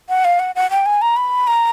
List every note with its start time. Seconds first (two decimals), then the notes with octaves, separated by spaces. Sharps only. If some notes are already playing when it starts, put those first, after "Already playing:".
0.09 F#5
0.25 F5
0.39 F#5
0.55 F#5
0.71 G5
0.86 G#5
1.02 A#5
1.17 B5
1.47 A#5